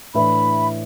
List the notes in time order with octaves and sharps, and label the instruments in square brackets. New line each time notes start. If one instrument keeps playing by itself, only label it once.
[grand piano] A2 E3 D4 B4 E5 [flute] B5